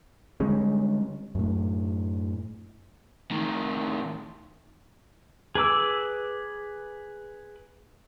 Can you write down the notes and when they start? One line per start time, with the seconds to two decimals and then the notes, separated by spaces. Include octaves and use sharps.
0.40 D3 G3 G#3 C#4
1.35 F#2 A2
3.31 A2 D#3
5.55 G#4 B4 D6 E6